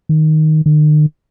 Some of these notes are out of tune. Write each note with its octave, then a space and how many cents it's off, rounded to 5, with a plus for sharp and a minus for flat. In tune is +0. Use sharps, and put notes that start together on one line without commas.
D#3 +0
D#3 -45